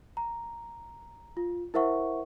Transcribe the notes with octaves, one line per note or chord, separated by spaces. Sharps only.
A#5
F4
E4 A#4 C5 E5 F#5 C#6